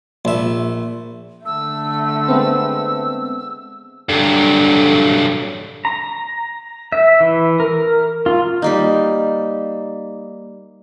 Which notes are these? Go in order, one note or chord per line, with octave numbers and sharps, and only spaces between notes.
A#1 E5
D3 A3 E6
G#3 B3 C4
G2 D3 F#3
A#5
E5
E3
A#4
F4
G3 A#3 D#4